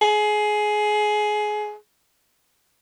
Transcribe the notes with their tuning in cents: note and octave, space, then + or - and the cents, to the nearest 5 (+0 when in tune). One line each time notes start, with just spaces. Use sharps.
G#4 +20